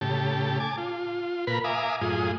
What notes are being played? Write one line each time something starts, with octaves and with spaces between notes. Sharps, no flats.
A2 C#3 G4 A5
G#5 A5 D6
F4
A#2 A#4 B4 B5
E5 F5 G#5 A#5 D6 D#6
F#2 A2 F4 G#4 D#6